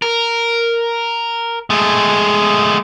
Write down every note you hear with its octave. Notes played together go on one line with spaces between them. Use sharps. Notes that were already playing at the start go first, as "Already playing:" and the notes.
A#4
G#3 A3